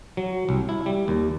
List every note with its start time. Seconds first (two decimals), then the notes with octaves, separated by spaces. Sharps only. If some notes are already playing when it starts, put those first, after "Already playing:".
0.17 F#3
0.49 C2
0.69 E4
0.86 G3
1.08 D#2